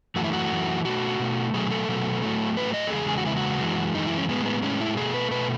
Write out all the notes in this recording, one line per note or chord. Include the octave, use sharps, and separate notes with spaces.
F#2 E3 A3 F#4
E4
F#4
F#2 E3 A3
B2 A3 F#4
B2 A3
B2 F#3 A3 G#4
A4
B2 F#3 A3
A2 F#3 A3
A2 F#3 A3 B4
D#5
A4
E2 C#3 G#3 G#4
G#4
F#4
E2 C#3 G#3 E4
F#4
F#2 E3 G#3
F#2 E3 G#3 D#4
E4
C#4
A2 G#3 B3
B3
A2 G#3 C#4
E4
B2 A3 G#4
B4
B2 A3 B4